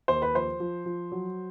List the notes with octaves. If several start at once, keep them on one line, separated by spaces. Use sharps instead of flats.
D#2 C5
B4
F3 C5
F3
F3
F#3